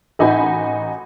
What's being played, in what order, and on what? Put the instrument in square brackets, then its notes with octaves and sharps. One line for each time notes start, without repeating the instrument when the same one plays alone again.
[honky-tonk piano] A1 D#4 F#4 G#5 B5 G6